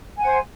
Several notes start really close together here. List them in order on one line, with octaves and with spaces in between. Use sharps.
G#5 F#5 C5